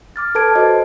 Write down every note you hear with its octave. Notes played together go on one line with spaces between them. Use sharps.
D6 F6 A6
A4 B4 A5 G#6 D7
F#4 C5 D#5